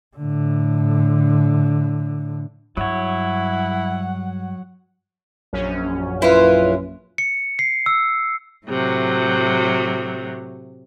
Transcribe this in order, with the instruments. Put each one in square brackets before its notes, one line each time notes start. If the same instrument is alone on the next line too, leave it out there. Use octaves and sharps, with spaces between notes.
[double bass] A2 D3
[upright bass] G2 [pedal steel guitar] F#3 C#5 [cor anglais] E4 [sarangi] F#5
[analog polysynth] A#1 F#2 C#4
[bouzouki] E4 F4 [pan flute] B4
[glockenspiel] C#7
C7
E6
[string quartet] A2 C3 F#3